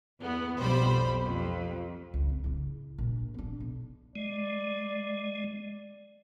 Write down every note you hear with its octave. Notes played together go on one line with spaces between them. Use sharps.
E2 B3
B1 F2 G3 C5 B5
F2
C#2
D2 C4
C#3 E4
A#1
B3 D4
B1
G#3 D5